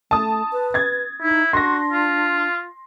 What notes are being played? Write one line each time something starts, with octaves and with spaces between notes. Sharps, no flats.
A3 A5 D#6
B4
G#6 A6
D#4 E4
D4 F#4 C6 A#6
F4